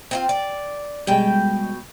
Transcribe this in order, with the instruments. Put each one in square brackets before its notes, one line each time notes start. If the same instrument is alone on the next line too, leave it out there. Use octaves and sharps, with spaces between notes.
[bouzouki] C4 E4 F4
D5
[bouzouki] B2 G5 [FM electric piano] G3 G#3